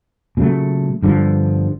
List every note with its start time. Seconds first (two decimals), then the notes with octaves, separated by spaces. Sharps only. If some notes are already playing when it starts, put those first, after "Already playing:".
0.37 A#2 C#3 F#3 A3
1.02 G1 G2 D3 F3